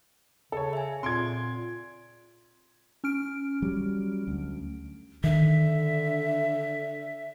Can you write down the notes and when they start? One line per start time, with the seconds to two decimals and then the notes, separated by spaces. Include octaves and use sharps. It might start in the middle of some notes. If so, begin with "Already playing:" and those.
0.52 C#3 A4 C#5
0.73 E5 G#5
1.03 A#2 C4 C6 G#6 D7
3.04 C#4 F6 D7
3.62 F#3 G3
4.28 D2
5.24 D3 D#3 E5